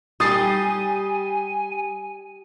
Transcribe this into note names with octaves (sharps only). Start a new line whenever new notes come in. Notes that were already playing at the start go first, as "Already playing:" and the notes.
G3 G4 G#5 D#6 A6 C7